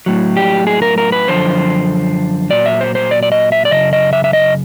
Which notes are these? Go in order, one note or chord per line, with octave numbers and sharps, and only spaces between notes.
A2 F#3
G4
G#4
A#4
A#4
B4
F#2 D3 F3 C5
A#2 F#3 D5
E5
C5
C5
D5
D5
D#5
E5
D5
F#2 C#3 D#5
D#5
E5
E5
D#5